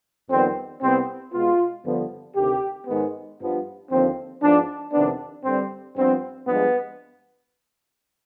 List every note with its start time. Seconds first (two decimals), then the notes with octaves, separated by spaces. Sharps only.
0.30 F2 D#3 G3 B3 C4
0.82 C2 C3 G3 B3 C4
1.33 B2 G#3 B3 F4
1.85 G2 D3 F3 B3
2.36 D2 C3 D#3 G4
2.87 G#2 D#3 G#3 B3
3.39 G2 F3 B3
3.90 D#2 D3 F3 C4
4.42 G#2 F3 B3 D4
4.93 F2 C3 D#3 B3 D4
5.44 G2 D3 G3 C4
5.96 G2 F3 B3 C4
6.48 G2 F3 G#3 B3